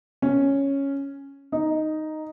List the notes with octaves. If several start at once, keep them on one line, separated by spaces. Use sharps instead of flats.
C#4
D#4